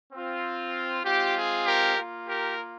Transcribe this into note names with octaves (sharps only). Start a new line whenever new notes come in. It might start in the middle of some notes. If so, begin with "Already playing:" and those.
C4 F4
G#3 C4 F4 G4
G#4
G4 A#4
A#3 F4
G4 A#4